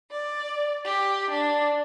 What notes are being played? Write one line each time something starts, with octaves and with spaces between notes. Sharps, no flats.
D5
G4
D4